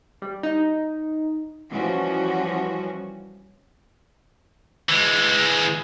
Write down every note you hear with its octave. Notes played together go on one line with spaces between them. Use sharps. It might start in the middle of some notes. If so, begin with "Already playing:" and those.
G3
D#4
E3 F3 G3 C#4 F#4
E3 G#3